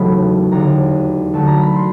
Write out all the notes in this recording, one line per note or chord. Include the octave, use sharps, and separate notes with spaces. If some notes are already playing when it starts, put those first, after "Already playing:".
Already playing: E1 D#2 C#3 F#3 A3 B5
E1 D#2 D3 A#5
D2 D3 F#3 A3 A5
A#5
B5
C6